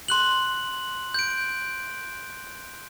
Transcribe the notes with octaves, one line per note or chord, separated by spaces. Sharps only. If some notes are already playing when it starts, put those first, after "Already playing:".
C6 F#6 F#7
G6 D7